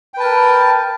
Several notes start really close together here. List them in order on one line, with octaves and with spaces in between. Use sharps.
G5 B4 A5 A#4